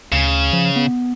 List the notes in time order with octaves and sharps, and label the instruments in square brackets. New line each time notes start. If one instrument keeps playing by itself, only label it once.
[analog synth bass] D2 [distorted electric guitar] C#3
[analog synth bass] F3
B3